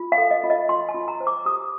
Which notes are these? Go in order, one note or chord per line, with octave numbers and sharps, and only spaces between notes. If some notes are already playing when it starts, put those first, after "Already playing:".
Already playing: F4
F5
A4
D#5
F4
D#5
F4 C6
A5
F4
A#5
C5
D6
G4 D#6